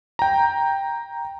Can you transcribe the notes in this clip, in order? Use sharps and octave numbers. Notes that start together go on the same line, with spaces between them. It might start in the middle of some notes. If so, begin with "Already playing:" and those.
G5 A#5